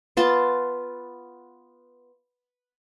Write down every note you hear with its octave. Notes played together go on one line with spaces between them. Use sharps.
B3 F4 A5 C6